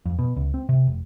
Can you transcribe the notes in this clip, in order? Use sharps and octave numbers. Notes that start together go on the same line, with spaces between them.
F2
B2
C#2
C4
C3
F1